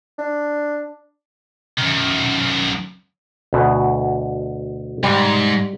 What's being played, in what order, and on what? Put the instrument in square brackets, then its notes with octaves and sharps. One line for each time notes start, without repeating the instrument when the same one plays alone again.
[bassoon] D4
[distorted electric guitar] F#2 D#3
[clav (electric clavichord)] D2 B2
[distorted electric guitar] G#2 [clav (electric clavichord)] G3